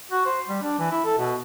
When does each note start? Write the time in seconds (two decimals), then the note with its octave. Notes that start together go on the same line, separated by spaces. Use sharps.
0.11 F#4
0.25 C5
0.48 G3
0.62 D4
0.79 E3
0.91 E4
1.05 A4
1.18 B2